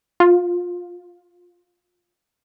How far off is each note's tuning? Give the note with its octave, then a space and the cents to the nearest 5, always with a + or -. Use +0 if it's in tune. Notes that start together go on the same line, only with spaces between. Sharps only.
F4 +15